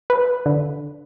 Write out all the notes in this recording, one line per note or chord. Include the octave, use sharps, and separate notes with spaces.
B4
D3